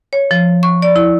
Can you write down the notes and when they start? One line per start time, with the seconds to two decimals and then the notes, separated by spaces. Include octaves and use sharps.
0.13 C#5
0.31 F3
0.63 C#6
0.82 D5
0.96 E4